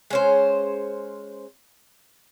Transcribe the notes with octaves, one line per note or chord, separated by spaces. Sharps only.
G#3 C#4 C5